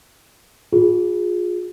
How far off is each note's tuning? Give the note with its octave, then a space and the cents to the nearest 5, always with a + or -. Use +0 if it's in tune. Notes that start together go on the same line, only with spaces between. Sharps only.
F4 +30 G#4 +0